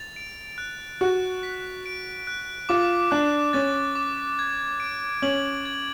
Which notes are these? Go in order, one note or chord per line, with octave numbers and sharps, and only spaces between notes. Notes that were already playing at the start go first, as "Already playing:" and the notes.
Already playing: A6 F7
D7
F#6
F#4 F#6
B6
D7
F#6
F4 D6
D4 F#6
C#4 A6
D6
G#6
D7
C#4 F#7
G#6